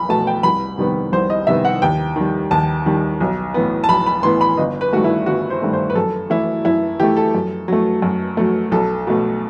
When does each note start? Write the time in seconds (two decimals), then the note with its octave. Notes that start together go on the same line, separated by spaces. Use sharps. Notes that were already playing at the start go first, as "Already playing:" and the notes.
Already playing: B1 B5
0.09 B2 A3 A5
0.27 G5
0.43 C2 B5
0.78 C3 D#3 G3 B3
1.12 C2 C5
1.30 D#5
1.47 C3 D#3 G3 B3 E5
1.65 F#5
1.82 D#2 G5
2.16 D#3 G3
2.51 D#2 A5
2.86 D#3 G3
3.20 B1
3.54 A2 E3 B3
3.84 A5
3.89 B1 B5
4.06 B5
4.23 A2 E3 B3 C6
4.41 B5
4.57 G1 D#5
4.81 B4
4.93 G2 D#3 A3 F#4
5.04 E4
5.26 G1 F#4
5.50 C5
5.62 G2 D#3 A3
5.73 C5
5.90 B4
5.95 F#2 A4
6.30 E3 A3 E4
6.65 F#2 E4
7.00 E3 A3 G4
7.17 A4
7.35 F#2
7.68 F#3 A3
8.02 F#2
8.37 F#3 A3
8.71 B1 A4
9.07 B2 A3